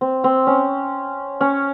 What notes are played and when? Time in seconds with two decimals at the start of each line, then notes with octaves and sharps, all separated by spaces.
0.01 C4
0.24 C4
0.47 C#4
1.41 C#4